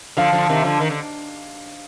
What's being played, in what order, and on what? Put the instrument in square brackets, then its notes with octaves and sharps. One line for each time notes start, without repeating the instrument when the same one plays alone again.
[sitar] D3 F3 [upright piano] F5
[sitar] D3 F3
C3 D#3
D3 F3
D#3
D3